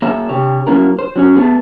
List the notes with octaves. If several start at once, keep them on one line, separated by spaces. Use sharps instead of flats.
A#3 G#4 C#5 E5
C3 G4 C#5
F#3 A#3 C#4 E4 A#4
C5
F#3 C#4 C#5
A3 B3 G#4